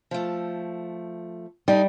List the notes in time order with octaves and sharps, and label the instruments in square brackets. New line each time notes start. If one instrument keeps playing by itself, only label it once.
[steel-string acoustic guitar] F3 A3
[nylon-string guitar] G3 [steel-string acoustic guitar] D#4 A4